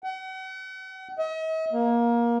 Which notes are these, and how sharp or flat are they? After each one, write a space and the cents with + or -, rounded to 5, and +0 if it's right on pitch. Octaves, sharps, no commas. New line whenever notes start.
F#5 +40
D#5 +45
A#3 +20